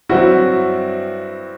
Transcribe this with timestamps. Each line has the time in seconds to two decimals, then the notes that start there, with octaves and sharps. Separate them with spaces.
0.09 G2 F#3 C4 E4 F#4